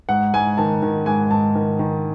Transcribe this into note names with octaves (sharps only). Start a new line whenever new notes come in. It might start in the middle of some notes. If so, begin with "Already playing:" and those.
G#2 F#5
G#2 G#5
D#3 A5
D#3
G#2 G#5
G#2 A5
D#3
D#3